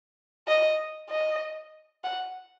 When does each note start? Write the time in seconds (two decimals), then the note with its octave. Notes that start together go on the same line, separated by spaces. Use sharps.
0.48 D#5
1.10 D#5
2.04 F#5